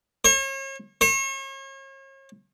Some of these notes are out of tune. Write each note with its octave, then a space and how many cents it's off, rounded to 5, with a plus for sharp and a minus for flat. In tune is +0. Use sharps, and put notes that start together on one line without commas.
C#5 -40
C#5 -40